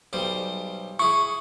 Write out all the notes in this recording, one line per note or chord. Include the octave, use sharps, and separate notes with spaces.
B1 G3 C5
E4 G#4 C#6